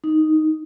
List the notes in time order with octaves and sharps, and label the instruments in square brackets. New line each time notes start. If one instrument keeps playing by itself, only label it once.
[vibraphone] D#4